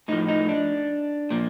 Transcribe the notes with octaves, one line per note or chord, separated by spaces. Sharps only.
A2 F3 D#4
D#4
D4
A#2 F3